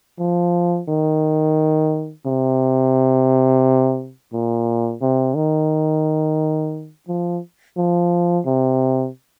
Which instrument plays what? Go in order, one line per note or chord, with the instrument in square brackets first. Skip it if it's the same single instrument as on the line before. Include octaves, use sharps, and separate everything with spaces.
[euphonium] F3
D#3
C3
A#2
C3
D#3
F3
F3
C3